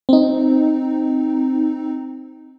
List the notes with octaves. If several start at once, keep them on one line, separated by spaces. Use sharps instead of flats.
C4 D#4